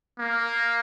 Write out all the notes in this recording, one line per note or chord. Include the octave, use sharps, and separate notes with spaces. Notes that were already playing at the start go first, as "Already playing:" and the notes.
A#3